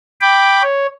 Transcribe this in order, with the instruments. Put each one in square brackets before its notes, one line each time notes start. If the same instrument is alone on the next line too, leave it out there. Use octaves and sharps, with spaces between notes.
[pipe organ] G5 B5 D6
C#5